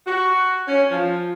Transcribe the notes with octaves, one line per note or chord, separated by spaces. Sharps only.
F#4
C#4
F3